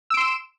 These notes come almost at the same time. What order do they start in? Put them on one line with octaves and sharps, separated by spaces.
E6 D7 C6 E7